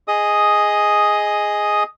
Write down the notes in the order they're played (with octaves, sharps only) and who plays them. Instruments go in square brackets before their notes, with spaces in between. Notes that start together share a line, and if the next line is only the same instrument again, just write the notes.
[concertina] G#4 D#5 D#6